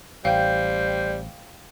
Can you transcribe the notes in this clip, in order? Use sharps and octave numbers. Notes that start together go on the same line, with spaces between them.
A1 G3 C5 F5 G5